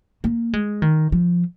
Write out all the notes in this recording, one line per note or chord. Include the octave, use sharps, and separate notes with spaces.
A#3
G#3
D#3
F3